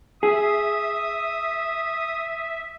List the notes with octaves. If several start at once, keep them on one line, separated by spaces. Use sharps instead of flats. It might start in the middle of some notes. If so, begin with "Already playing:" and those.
G#4 E5 D#6